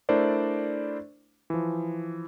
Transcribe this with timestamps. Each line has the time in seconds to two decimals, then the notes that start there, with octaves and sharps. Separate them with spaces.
0.09 A3 D4 E4 A#4 C5 D5
1.50 E3 F3